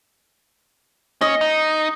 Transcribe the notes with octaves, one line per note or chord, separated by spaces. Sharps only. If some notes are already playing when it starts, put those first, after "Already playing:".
C#4 D#5
D#4